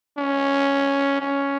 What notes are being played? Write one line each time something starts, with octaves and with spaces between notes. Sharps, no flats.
C#4
C#4